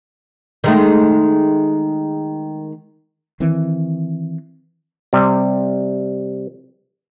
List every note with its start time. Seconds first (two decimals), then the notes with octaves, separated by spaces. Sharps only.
0.64 D#3 G#3 A3
3.40 D#3 E3 C4
5.13 C3 G3